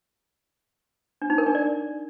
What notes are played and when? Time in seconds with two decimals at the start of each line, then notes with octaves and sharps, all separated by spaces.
1.22 D4
1.30 D#4
1.38 A#4
1.46 D4
1.55 D5